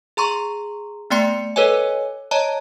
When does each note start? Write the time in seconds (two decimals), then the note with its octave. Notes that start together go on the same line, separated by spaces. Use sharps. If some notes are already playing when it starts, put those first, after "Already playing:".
0.17 G#4 A#5 C6 C#6
1.10 A3 B3 D5 G5 C6 C#7
1.56 A4 B4 C#5 D#5 G#5
2.31 C#5 D#5 A5 A#5